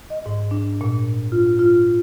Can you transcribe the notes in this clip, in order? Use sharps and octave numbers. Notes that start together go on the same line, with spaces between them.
D#5
G#2
D4
A#2
F4
F4